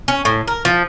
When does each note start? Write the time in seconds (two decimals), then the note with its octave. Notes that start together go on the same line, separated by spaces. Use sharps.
0.08 C#4
0.25 A2
0.48 A#4
0.65 F3